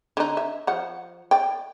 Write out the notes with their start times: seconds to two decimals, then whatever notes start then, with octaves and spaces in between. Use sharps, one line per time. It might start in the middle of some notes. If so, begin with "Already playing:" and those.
0.17 D3 D#4
0.37 E5
0.67 F3 F#5
1.31 D5 G5